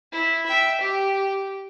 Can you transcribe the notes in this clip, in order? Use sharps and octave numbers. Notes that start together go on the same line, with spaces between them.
E4
E5 G5
G4